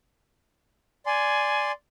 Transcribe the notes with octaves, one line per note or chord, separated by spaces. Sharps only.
D5 G#5 C6